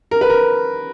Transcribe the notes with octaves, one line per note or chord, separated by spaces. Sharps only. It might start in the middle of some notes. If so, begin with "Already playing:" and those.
A#4
B4
A#4